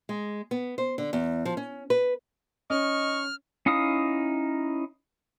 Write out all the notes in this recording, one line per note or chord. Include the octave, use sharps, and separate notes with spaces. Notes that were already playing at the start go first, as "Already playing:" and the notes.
G#3
B3
C5
D3
E2
F3
C#4
B4
C#4 D#4 D#5 C#6 F6
C#4 D#4 E4 F5 D#6